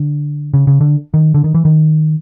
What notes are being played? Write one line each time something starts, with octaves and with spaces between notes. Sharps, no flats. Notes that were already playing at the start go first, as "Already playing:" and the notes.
Already playing: D3
C#3
C#3
D3
D#3
D3
D#3
E3
D#3